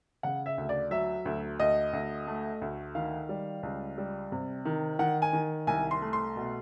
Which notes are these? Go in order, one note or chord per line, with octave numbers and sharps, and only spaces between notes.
C#3 F#5
E5
D2
D5
F#3 E5
D2
D2 D#5
D2
A3
D2
D#3 F5
G3
C#2
G3
C3
D#3
D#3 F#5
G#5
D#3
C2 G#5
C6
A3
C6
B2